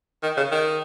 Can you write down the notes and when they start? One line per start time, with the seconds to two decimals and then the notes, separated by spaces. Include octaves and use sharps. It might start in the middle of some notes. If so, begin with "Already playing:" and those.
0.23 D#3
0.37 C#3
0.52 D#3